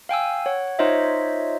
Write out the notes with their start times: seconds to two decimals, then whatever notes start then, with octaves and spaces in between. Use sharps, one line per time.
0.09 F5 G5 G#5 E6
0.46 C#5 F#5
0.79 D#4 F4 C5 C#5 D#5 E5